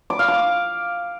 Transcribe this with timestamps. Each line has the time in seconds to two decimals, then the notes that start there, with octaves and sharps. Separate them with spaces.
0.10 D6
0.19 F5
0.28 D6